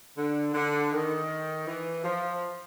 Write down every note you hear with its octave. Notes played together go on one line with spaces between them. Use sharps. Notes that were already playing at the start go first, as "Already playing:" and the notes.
D3
D3
D#3
E3
F3